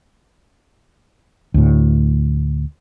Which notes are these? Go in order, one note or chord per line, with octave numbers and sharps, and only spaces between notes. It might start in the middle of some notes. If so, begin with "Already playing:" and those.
D2 A2